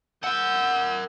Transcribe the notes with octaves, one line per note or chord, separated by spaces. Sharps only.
A#4 F#5 E6 G6